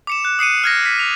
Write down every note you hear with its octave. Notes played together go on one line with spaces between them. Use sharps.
D6 C#7 E7
F#6
D#6 C7 C#7 D#7
F6 G#6 A#6
B6
F7